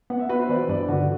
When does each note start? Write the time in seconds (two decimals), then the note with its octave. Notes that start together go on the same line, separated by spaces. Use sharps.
0.10 B3 F#5
0.19 E5
0.29 F#4 B4
0.39 C5
0.49 E3 D5
0.69 G2 D5
0.89 D3 F#4